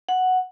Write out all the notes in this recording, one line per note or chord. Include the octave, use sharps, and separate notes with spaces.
F#5